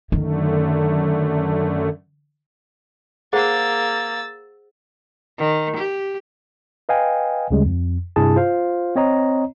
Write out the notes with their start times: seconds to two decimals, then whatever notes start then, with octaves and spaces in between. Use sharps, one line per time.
0.12 F#2 D3 D#3 A3
3.33 A#3 G#4 C5 F#5 E6 A6
5.38 D#3
5.76 G4
6.89 B4 D#5 F5 G5 G#5
7.51 D2 C#3 G3 G#3
7.66 F2
8.16 G2 C3 E4 G#4 A5
8.36 F4 C5 F5
8.96 C4 C#5 D#5 A#5